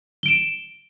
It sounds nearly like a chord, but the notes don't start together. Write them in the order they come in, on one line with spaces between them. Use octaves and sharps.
G7 D7 E7